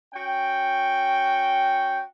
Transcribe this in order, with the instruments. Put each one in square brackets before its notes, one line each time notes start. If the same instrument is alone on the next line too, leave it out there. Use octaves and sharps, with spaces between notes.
[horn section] C#4 F#4 G5